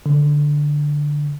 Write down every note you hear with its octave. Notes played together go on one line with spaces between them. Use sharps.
D3